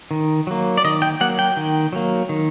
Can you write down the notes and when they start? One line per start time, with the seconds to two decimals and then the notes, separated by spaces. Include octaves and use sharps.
0.11 D#3
0.47 F#3 A#3
0.78 D5
0.84 D#3 D#5
1.02 G5
1.21 F#3 A#3 F#5
1.39 G5
1.57 D#3
1.93 F#3 A#3
2.29 D#3